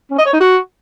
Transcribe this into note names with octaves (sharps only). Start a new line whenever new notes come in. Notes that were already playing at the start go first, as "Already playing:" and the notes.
C#4
D#5
C#5
D#4
F#4